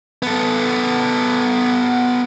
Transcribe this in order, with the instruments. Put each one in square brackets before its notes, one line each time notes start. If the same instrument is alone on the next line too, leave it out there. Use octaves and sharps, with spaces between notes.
[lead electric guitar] B3 A4